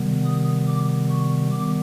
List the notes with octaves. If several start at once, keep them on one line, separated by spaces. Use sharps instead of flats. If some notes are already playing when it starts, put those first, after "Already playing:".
Already playing: C3 D#3 G3 B3
D#6
D6
C#6
D#3 G3 B3 D6